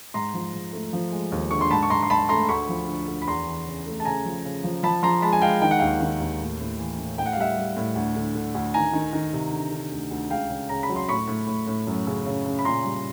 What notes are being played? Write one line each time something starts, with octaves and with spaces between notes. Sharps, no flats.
G#2 A#5 C6
F3
G#2
A3
F3
G#3
D#2
D3 C#6
C6
G#2 A5 B5
C#6
G#2 A#5 C6
C6
G#2 A5 B5
A3 A#5 C6
D2 B5 C#6
F3
D3
D2
B5
E2 A#5 C6
E3
C#3
A3
A5
C#3 G#5 A#5
F3
C#3
F3
F3 A5 B5
F3 A#5 C6
G#3 A5 B5
G#5
G#3 F5 G5
D#3 G5
F#5
D#2 F5 G5
D#3
D#2
A2
A2
E3
A2
A2 G5
F#5
F5
G3 E5 F#5
G3
A2
D2
D3
D3
D2
D#3 G#5 A#5
D#3
D#3
C3
D3
D3
D2
D2
C#2 F5 G5
C#3
C#3 A#5
B5
F#3
C6
A2 B5 C#6
A2
A2
A2
F#2
C#3
C#3
C#3
B5
A#2 A#5 C6
G3